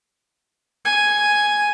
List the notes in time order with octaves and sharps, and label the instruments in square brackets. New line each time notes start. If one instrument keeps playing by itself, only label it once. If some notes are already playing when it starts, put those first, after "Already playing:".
[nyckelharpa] G#5